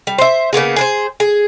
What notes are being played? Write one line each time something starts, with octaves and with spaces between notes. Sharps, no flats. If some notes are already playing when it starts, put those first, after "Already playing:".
G3
C5 E5
C#3 A#3 B3 G#4
G#4 B4 C5
G#4